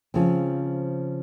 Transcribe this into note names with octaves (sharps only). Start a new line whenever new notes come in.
C#3 F3 G#3 C4